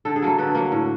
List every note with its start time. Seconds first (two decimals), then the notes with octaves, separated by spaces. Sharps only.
0.05 D3 A4
0.16 G#4
0.22 F#3 A#3 A4
0.38 D3 B4
0.55 F#3 A#3
0.72 A2